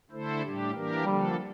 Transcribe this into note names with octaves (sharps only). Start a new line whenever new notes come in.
D3 A3 E4 A4 C5
A2 G3 D4 G4
E3 A#3 D4 G4 A#4
D3 F3 G3 A#3 D4 A4